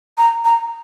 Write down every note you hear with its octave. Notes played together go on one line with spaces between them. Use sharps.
A#5
A#5